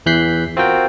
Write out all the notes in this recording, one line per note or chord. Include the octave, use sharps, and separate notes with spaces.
E2 E3 F#6 G6 B6 C7
C4 F4 F#4 A#4 G5